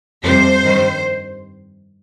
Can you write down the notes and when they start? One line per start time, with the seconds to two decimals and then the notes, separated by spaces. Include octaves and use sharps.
0.24 F2 C3 G3 C5
0.63 G2 D#3 G3